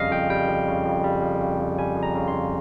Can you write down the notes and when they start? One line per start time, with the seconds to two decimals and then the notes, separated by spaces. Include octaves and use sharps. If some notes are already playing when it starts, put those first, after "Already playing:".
Already playing: F2 C#3 G3 D#5 F5
0.11 F2 G5
0.30 G3 G5
0.48 F2
0.68 C#3
0.85 F2
1.04 G3
1.22 F2
1.41 C#3
1.59 F2
1.79 G3 G#5
1.96 F2
2.03 A#5
2.15 C#3
2.28 C6
2.33 F2